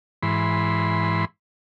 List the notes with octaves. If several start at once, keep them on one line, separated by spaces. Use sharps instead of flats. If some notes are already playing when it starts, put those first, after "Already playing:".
G#2 E3 B5 C6